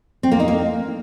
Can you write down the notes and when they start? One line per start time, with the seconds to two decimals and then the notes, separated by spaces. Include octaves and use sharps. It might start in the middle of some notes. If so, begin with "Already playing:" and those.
0.23 C4
0.31 A#3
0.40 D#4
0.48 A#3